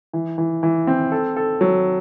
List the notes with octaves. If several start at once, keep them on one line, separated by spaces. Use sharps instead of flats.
E3
E3
E3
C4
A4
A4
F#3